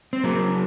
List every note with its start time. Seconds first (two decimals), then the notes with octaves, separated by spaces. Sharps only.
0.13 C4
0.24 F#3 A#3